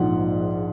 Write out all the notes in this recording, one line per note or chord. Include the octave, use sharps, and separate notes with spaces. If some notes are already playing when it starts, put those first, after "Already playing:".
Already playing: A#1 G#2 F3 F#5